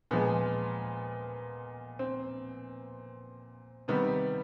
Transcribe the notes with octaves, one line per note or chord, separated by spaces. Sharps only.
A#2 F3 G#3 B3
C4
C3 D#3 G3 B3